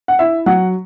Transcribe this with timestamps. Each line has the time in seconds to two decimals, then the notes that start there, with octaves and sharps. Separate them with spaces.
0.08 F#5
0.19 E4 E5
0.46 F#3 F#5